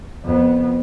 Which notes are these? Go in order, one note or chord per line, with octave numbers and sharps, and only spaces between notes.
F2 B3